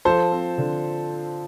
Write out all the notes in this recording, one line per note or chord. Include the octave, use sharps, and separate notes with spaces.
F3 A4 C5
C4
D3